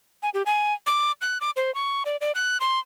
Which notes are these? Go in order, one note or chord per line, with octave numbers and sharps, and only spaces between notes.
G#5
G4
G#5
D6
F#6
D6
C5
C#6
D5
D5
F#6
C6